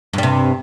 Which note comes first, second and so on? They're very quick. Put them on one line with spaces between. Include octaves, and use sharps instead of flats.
G2 G3 C3